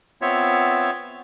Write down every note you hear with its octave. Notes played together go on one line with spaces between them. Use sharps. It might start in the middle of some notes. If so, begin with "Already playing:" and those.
B3 C4 F4 C#5 E5